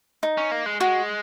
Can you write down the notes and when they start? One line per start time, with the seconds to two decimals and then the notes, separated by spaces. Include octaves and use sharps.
0.23 D#4
0.37 C#4
0.52 A#3
0.66 G#3
0.80 G#3 F#4